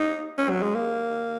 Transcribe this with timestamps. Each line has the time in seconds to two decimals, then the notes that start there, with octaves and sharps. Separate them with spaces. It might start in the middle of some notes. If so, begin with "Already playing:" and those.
Already playing: D#4
0.38 C#4
0.50 F#3
0.62 G#3
0.74 A#3